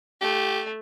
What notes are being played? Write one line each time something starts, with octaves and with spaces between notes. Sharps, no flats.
A3 G4